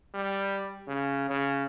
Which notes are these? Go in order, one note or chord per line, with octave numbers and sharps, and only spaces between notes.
G3
C#3
C#3